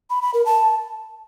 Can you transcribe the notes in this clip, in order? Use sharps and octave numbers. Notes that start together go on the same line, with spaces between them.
B5
B5
A#4
A5